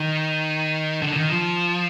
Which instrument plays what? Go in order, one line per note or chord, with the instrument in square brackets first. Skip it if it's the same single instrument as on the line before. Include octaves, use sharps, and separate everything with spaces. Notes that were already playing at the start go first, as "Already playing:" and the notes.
Already playing: [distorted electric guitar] D#3
D3
D#3
F3